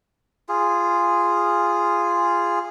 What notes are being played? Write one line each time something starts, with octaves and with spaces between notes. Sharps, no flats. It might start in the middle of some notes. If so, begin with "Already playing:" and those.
F4 G#4